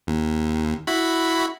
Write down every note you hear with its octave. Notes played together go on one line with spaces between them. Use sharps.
D#2
E4 F#4 B5